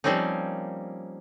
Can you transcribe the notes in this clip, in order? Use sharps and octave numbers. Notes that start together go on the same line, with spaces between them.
F3 G3 A#3 C4 C#4 D#4